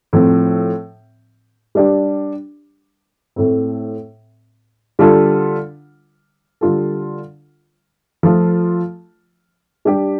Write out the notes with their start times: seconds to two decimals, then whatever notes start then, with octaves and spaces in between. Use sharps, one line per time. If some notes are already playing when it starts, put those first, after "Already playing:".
0.13 A2 F3 C4
1.75 G3 D4 G4
3.36 A2 A3 C4
4.99 D3 G3 F4 A4
6.61 D3 G3 F4 A4
8.23 F3 A3 F4 A4
9.85 G3 D4 G4